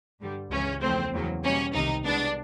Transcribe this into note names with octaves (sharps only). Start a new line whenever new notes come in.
G2 D3 G3
C#2 C#3 E3 C#4
E2 C#3 F3 A3 C4
E2 C#3 F#3 A#3
B2 G3 A#3 C#4
C2 C3 D#3 D#4
C2 B2 G#3 B3 D4